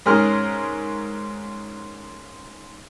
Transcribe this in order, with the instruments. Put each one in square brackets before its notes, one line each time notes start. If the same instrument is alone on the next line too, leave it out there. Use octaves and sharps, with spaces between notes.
[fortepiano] G#2 C#4 G#4 A#4 C6 F6